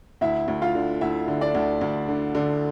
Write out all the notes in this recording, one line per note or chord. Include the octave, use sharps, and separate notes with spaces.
D2 E4 E5
D2
F4 F5
D3
D2 E4 E5
D3
D4 D5
D2
D2
D3
D3